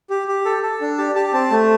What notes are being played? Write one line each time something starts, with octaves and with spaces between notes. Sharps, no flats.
G4
G4
A4
A4
D4
G4 A5
G4 A5
C4 A5
A3